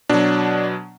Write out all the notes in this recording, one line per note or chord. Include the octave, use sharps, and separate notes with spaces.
B2 F#3 D4